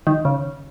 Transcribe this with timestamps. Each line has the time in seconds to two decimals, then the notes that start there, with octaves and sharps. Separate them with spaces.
0.07 D#3
0.25 C#3